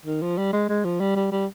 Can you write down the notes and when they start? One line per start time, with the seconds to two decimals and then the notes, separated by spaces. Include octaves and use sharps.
0.05 D#3
0.22 F3
0.38 G3
0.53 G#3
0.69 G#3
0.85 F3
1.00 G3
1.16 G3
1.32 G3